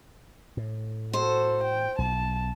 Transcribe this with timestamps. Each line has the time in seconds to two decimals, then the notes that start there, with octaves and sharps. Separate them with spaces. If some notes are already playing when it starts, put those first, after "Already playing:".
0.57 A2
1.13 F#4 A4 C5
1.64 G5
1.98 B1 A5